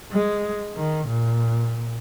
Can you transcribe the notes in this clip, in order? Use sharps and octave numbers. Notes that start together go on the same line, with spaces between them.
G#3
D#3
A#2